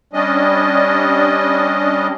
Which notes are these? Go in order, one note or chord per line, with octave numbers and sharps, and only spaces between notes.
G3 C#4 D4 D#5